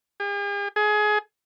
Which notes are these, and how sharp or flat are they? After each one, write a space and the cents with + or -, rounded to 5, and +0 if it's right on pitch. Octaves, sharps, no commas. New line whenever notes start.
G#4 -45
G#4 +25